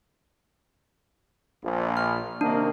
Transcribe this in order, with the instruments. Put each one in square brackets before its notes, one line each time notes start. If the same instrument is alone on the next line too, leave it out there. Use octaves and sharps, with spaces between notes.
[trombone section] A#1
[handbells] F6
[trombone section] C3 D#3 A#3 [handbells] D4